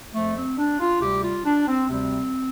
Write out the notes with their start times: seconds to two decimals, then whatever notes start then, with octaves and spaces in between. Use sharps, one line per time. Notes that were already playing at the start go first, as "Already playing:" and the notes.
0.13 F2 F3 A3
0.36 C4
0.58 D4
0.79 F4
1.01 D2 C3 G3 G4
1.23 F4
1.44 D4
1.67 C4
1.88 D2 C3 G3 C4